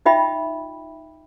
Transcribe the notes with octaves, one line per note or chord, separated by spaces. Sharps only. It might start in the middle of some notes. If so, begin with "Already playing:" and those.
D#4 F4 D#5 E5 G5 B5